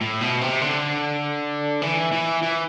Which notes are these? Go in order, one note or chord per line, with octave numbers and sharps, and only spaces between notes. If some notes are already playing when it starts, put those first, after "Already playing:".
A2
B2
C3
D3
E3
E3
E3